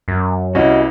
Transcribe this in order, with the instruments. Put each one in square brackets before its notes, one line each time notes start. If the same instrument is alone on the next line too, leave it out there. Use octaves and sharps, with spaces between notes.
[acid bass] F#2
[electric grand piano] C2 C#4 [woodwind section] B3 E4 [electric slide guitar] F#4 D#5